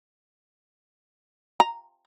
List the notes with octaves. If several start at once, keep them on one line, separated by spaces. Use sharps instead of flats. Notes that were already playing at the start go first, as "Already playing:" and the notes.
A#5